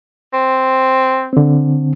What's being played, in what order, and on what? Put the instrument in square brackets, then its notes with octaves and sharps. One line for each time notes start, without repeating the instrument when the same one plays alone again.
[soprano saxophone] C4
[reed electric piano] D3 C4